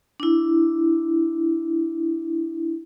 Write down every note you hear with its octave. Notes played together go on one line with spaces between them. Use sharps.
D4 E4